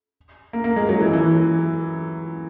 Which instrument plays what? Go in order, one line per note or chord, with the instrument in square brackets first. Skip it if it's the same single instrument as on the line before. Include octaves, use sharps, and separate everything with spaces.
[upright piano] A#3
A#3
G#3
F#3
E3
E3